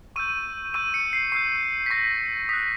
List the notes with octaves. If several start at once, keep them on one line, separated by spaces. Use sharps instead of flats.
C#6 E6 G6 D#7
C#6 E6 G6 D#7
C#7
C7
C#6 E6 G6 C7
B6
C#6 E6 G6 A#6
D#6 F#6 B6